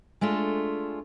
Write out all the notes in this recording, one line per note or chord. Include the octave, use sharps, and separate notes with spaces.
G#3 A3 D4 F4